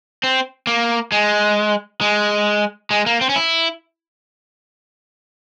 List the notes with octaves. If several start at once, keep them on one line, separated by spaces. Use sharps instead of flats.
C4
A#3
G#3
G#3
G#3
A#3
C4
C#4
E4